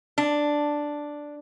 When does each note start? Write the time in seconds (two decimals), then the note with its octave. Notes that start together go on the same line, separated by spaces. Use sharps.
0.18 D4